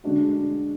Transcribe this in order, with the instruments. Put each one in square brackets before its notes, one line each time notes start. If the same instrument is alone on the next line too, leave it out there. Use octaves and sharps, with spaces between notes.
[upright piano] D3 G#3 D4 F#4